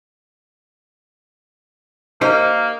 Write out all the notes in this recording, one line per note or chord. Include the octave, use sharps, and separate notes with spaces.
A#3 D#4 G4 C5